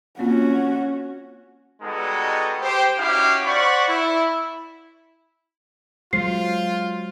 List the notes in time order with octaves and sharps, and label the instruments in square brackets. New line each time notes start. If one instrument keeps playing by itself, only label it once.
[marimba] A#3 C4 F4 [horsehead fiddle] C#4 F#4
[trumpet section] G3 G#3 B3 D#4 F#4 A4
G4 C5
C#4 D#4 E4 F#4 G4 F5
C5 D5 F#5 B5 C#6
E4
[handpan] F#3 G#3 C5 [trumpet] F4 [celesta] C7